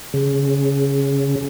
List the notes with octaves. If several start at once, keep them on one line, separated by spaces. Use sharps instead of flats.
C#3